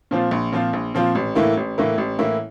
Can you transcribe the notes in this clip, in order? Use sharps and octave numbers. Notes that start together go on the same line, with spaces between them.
A#2 F3 C4 F4
A#1
A#2 F3 C4 F4
A#1
A#2 F3 C4 F4
A1
A2 E3 A#3 E4
A1
A2 E3 A#3 E4
A1
A2 E3 A#3 E4